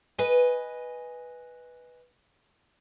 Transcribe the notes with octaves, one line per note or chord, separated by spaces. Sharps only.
B4 D#5 G#5